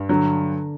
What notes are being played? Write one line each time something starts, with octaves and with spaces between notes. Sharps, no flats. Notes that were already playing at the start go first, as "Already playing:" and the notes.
Already playing: G2
D3 F#3